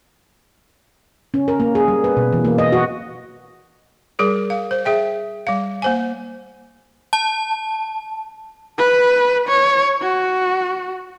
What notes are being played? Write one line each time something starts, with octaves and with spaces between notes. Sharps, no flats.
C#4
A#4
A#3
G#4
G3
B4
B2
E3
A#3
D#5
F#4
G3 G#4 A#4
F5
C5
G#4 E5 G5
G3 F5
A#3 C5 G#5
A5
B4
C#5
F#4